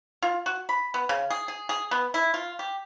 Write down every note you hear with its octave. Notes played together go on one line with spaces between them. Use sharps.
F4
F#4
B5
B3
C#3
G#4
G#4
G#4
B3
E4
F4
G4